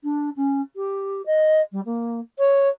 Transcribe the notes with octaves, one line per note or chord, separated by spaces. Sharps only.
D4
C#4
G4
D#5
G3
A#3
C#5